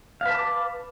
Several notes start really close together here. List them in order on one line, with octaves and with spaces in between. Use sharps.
F5 B4 A5 D6